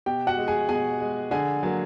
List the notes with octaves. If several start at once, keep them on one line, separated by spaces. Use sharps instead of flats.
B2 G4 G5
F#4 F#5
G#3
G#4 G#5
B2 G#4 G#5
G#3
D3 G#4 G#5
F#3 A#3